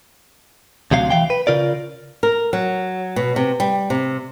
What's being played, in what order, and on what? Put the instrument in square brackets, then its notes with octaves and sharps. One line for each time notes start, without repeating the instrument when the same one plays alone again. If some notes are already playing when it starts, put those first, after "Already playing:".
[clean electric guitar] D2 C3 F#3 F5
E3 F5 G5
B4
C#3 F4 A#4 D5
[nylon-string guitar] A#4
F#3
B2
C3
G3
C3